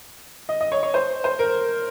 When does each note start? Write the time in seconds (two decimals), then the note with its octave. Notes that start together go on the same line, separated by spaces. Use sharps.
0.49 D#5
0.61 D#5
0.72 C#5
0.83 C#5
0.94 C5
1.24 C5
1.39 A#4